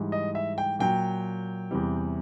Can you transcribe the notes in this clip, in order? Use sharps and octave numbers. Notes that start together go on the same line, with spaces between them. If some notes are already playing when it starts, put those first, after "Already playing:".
Already playing: G#2 E3 G3
D#5
E5
G5
A#2 F#3 G5
E2 C3 E3 G3